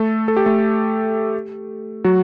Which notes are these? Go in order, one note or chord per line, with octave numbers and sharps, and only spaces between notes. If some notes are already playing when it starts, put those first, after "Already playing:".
Already playing: A3 A4
A4
G4
A3 A4
F#3 F#4